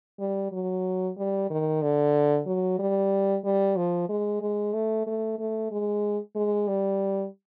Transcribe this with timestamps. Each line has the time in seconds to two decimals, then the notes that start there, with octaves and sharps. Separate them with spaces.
0.20 G3
0.52 F#3
1.18 G3
1.50 D#3
1.82 D3
2.46 F#3
2.79 G3
3.44 G3
3.77 F3
4.09 G#3
4.42 G#3
4.74 A3
5.07 A3
5.39 A3
5.72 G#3
6.35 G#3
6.68 G3